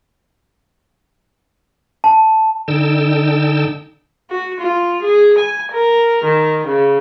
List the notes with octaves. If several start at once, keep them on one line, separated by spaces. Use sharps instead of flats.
A5
D3 D#4 G5 A5 E6
F#4
F4
G#4
G#5
A#4
D#3
C#3